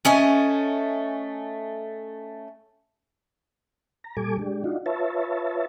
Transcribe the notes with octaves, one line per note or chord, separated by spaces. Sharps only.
A3 C#4 D#5 G#5
A#5
A#2 G3 A4 G#5 D6
G#3 D4 G4
D4 D#4 F4 F#4
F4 B4 C#5 E5 A5